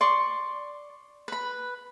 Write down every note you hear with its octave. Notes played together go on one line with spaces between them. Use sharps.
D5 C6 C#6
B4 B5